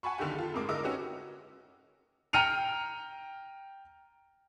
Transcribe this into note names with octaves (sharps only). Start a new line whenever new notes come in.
F#5 G#5 A5 B5 C#6
B1 D3 D#3 G4 F#5
F4 A4
F1 G#2 A#3 D6
D3 E4 A#4 D#5 D6 E6
C#4 D#4 F#4 G4 B4 C#5
G5 A#5 F6 C#7 D#7 F7